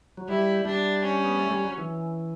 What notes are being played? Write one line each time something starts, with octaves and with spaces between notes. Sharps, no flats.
F#3
G3 E4
G3 D4
C#4
B3
A3
G3
F#3
E3